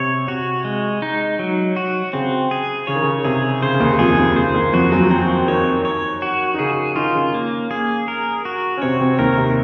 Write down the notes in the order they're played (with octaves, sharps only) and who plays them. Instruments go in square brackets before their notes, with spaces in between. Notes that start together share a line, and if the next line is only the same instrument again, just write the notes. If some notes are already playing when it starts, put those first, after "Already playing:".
Already playing: [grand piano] C3 [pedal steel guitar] C#5
[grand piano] C3 [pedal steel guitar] F#4
[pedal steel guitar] G#3
D#4
F#3
F#4
[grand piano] C#3 [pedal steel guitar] C4
[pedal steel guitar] G#4
[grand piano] C#3 [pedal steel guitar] C#5
[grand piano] D#3
C#3
[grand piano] C3 [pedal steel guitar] G#4
[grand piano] C#3 [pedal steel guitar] C5
[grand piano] C#3
D#2 D#3
[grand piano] F2 F3 [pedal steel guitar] G#4
[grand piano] D#2 D#3
[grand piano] C#3 [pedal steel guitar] C5
[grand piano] D#2 D#3
[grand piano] F2 F3 [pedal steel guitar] F#4
[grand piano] F#2 F#3
[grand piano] F#2 F#3 [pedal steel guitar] C4
[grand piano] D#3 D#4 [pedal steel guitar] C#5
[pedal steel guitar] C#5
F#4
[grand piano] D#4
[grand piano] C#3 C#4 [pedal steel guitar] G#4
[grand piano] D#3 D#4 [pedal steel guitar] F4
[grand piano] C#3 C#4
[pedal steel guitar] A#3
G#4
A#4
F#4
[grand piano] C#4
[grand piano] C3 C4 [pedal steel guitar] C#5
[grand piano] C3 C4
[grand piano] D#2 D#3 [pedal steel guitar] A#4
[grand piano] C3